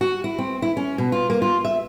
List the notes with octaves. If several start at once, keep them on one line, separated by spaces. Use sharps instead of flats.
F#4
E4
C4
E4
C#4
B2
F4
A#3
F4
E5